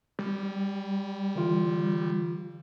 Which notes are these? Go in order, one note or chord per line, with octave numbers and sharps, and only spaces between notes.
G3
D3 E3 F4